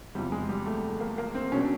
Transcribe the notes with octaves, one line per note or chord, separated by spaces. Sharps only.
E2 C3 F3 G3
G#3
G3
A3
A#3
A#3
C4
B2 F#3 C#4
D4